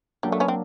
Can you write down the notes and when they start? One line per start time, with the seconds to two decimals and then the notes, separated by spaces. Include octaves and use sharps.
0.23 F#3 G3 A#3 D4
0.32 A3
0.40 B3 C#4
0.48 C4